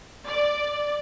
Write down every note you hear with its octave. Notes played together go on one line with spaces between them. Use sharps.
D5